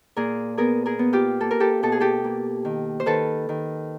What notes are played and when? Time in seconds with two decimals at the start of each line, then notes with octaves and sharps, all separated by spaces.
0.16 A#2 G#4 A#4
0.57 B3 G#4 A#4
0.86 G#4 A#4
0.99 B3
1.13 F4 G4
1.41 A#3 A4
1.51 A#4
1.60 G4 A4
1.83 B2 A4
1.92 G#4
2.00 G4 A4
2.24 A#3
2.65 D#3
3.00 C5
3.06 D#3 A4 B4
3.49 D#3